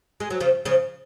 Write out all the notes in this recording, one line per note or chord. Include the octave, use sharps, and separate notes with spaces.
G#3
F#3
C#3 F3
C#3 F3